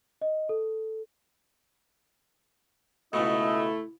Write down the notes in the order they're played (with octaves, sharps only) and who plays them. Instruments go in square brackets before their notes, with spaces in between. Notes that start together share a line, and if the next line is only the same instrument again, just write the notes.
[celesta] D#5
A4
[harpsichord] C#2 G#2 B2 [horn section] A3 [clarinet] E4 [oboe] D#5